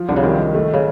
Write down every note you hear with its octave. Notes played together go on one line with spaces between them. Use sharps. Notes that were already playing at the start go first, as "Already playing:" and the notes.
Already playing: F3
C2 D3
C#3
C3 D#3
D#3
A3
C#3